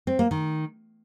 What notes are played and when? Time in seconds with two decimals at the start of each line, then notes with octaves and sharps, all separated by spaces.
0.07 C4
0.19 A#3
0.31 D#3